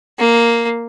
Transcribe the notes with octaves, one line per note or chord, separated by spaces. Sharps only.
A#3